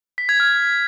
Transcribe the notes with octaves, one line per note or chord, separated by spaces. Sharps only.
B6
G#6
F6